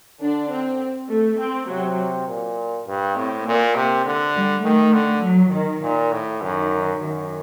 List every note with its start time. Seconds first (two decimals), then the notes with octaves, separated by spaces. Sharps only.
0.21 D3 D4
0.51 C4
1.10 A3
1.39 C4
1.69 C3 F#3
2.28 A#2
2.87 G2
3.16 A2 C4
3.46 A#2 A#3
3.75 C3
4.05 D3
4.35 G3
4.64 D#3 A3
4.93 D3
5.23 F#3
5.52 D#3
5.82 A#2
6.12 A2
6.41 F#2 D#3
7.00 F#2 D#3